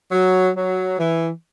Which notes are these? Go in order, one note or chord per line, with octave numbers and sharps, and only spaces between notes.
F#3
F#3
E3